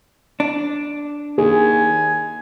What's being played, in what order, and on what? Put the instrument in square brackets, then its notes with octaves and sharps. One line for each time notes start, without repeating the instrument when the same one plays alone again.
[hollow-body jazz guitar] D4
[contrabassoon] D#2 [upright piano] G#4 [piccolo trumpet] G#5